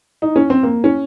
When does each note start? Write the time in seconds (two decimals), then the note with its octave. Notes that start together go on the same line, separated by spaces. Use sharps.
0.22 D#4
0.36 C#4
0.50 C4
0.63 A#3
0.84 C#4